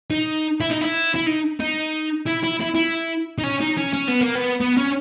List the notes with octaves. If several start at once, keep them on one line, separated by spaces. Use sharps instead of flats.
D#4
E4
D#4
E4
E4
D#4
D#4
E4
E4
E4
E4
D#4
C#4
D#4
C#4
C#4
B3
A#3
B3
B3
C#4